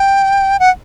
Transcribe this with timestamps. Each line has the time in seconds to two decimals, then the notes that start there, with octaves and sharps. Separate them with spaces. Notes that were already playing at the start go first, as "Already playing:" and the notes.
Already playing: G5
0.60 F#5